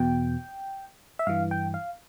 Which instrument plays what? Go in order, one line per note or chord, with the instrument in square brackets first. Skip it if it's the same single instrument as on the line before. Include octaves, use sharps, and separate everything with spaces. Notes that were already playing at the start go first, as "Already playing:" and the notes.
Already playing: [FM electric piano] E2 B2 G5
E5
G2 E3 F5
G5
F5